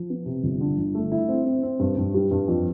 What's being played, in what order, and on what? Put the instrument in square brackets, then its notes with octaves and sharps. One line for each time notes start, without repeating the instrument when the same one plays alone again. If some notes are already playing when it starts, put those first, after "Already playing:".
Already playing: [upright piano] F3
B3
C3
G1
D3
G1
A3
E4
C4
C4
C4
G2
G2
G3
G2
F2